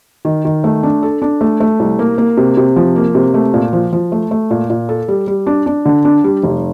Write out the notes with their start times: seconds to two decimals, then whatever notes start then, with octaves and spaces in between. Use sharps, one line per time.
0.25 D#3
0.45 D#3
0.64 A3
0.83 D4
1.03 A4
1.22 D4
1.41 A3
1.60 A3
1.80 C2
1.99 A#3
2.18 A#3
2.37 C3
2.57 C3
2.76 F3
2.96 A#3
3.15 C3
3.34 A3
3.54 A#2
3.73 F3
3.93 F3
4.12 A3
4.31 A3
4.50 A#2
4.70 A#2
4.89 A4
5.08 G3
5.27 G3
5.47 D4
5.66 D4
5.85 D3
6.05 D4
6.24 G3
6.43 F1